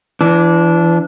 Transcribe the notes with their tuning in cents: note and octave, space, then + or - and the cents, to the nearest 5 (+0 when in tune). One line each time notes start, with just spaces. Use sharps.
E3 +30 D4 -15